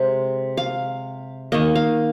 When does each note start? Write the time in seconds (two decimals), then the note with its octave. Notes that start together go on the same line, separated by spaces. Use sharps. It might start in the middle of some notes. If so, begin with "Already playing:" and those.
Already playing: C3 G#3 C4
0.57 F5
1.52 D#3 A#3 D#5
1.75 F5